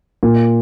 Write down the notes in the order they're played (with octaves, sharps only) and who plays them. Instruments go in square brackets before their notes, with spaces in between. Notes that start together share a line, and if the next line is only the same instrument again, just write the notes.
[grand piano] A#2